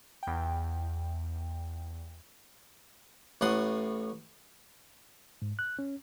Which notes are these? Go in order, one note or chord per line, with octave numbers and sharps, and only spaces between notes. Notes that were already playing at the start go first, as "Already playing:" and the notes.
E2 G5
A1 A2 F#5 C6 D#6
G#2
F#6
C#4